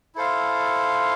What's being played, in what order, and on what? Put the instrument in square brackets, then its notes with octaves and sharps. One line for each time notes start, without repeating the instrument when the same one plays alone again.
[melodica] E4 A4 C5 F5